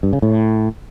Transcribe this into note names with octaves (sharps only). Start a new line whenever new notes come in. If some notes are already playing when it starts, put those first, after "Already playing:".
G2
C#3
A2